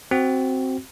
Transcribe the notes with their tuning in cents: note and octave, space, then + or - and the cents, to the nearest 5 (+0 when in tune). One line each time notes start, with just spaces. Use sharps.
C4 +0 F#4 +15